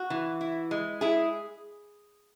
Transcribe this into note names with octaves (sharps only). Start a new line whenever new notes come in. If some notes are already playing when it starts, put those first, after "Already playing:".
Already playing: F#4
E3
E4
G#3
E4 G#4